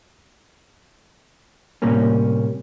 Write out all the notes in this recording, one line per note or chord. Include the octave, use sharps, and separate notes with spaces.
A2 C3 G3 A#3 C#4